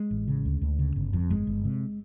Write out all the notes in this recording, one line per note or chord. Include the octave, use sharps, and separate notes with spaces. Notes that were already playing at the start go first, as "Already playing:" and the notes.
Already playing: G#3
A1
C#3
D2
D2
C#3
G1
F2
G1 G#3
G1
C3